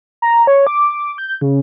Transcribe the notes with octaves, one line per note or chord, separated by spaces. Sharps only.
A#5
C#5
D6
G6
C#3